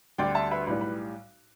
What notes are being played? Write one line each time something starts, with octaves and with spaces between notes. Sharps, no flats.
D2 D3 G3 D5 G5
E5 A5
B4 E5
B1 A2 G3 B4
B4